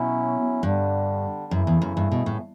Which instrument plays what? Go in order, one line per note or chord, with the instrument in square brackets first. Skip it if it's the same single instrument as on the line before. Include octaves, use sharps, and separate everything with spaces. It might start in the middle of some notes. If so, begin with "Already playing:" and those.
Already playing: [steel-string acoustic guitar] B2 [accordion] F#3 C#4 E4
[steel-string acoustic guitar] G2 [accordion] D3 G3 D4
[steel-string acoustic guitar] F#2 [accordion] C#3 E3 A3 E4
[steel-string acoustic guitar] E2
F#2
G2
B2
A2